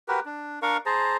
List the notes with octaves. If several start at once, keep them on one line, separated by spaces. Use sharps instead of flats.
F#4 G4 A#4 B4
D4
D4 A#4 F5 C#6
G#4 C5 A5 A#5